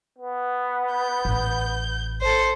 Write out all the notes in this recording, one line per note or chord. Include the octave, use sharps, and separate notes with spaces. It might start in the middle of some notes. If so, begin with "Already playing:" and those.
B3
G6
A1
A4 C5